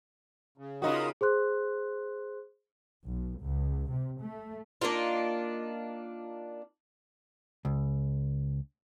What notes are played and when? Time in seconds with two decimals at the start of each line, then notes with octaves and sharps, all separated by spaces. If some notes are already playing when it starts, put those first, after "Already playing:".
0.58 C#3
0.82 C#3 D#4 F4 F#4 A#4 D#6
1.21 G#4 C5 C6 F#6
3.04 B1
3.40 C#2
3.90 C3
4.21 A3
4.81 A#3 D4 D#4 F4
7.65 C#2